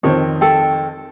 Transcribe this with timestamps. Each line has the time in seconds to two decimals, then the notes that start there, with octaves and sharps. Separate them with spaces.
0.03 F2 D#3 C4 C#5
0.41 A4 G5